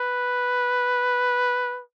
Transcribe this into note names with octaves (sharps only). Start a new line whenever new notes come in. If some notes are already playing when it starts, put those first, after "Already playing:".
Already playing: B4